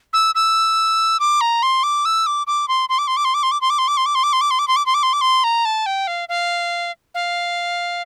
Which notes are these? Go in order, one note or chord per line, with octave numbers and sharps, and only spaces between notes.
E6
E6
D6
A#5
C6
D6
E6
D6
D6
C6
C6
D6
C6
D6
C6
D6
C6
D6
C6
D6
C6
D6
C6
D6
C6
D6
C6
D6
C6
D6
C6
D6
C6
D6
C6
D6
C6
A#5
A5
G5
F5
F5
F5